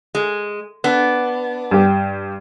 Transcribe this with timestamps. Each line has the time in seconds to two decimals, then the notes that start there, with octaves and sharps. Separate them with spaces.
0.15 G#3
0.84 B3 D4
1.71 G2 G4